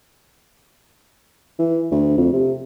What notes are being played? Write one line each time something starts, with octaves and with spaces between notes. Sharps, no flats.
E3
D2
F2
C3